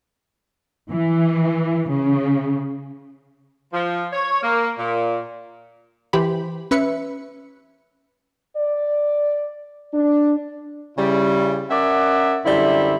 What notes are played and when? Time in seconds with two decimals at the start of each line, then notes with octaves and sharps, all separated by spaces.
0.90 E3
1.89 C#3
3.73 F3
4.12 C#5
4.42 A#3
4.78 A#2
6.13 E3 G4 C5 B5
6.71 C#4 B4 E5 C#7
8.57 D5
9.93 D4
10.97 C#3 G3 E4
11.70 C#4 A#4 D5 E5 F#5
12.45 F#2 D3 G3 E4 C5 E5